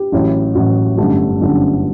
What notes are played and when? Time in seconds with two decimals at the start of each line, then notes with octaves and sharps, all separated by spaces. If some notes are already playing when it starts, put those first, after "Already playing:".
Already playing: G4
0.12 A1 A2 F#3
0.55 A1 A2 F#3 F#4
0.97 G1 F#2 D3 G3 A3
1.40 G1 F#2 D3 G3